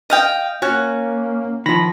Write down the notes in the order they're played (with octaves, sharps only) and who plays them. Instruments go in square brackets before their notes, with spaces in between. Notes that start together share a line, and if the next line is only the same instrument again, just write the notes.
[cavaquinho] D#5 F5 G5
[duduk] A#3 [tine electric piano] C#4 C#5 [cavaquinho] F#4
[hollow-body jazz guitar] D#3 F3 [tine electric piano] B5 A#6